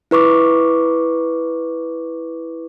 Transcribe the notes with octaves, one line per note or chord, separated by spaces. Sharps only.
E4 B4 C#6 D6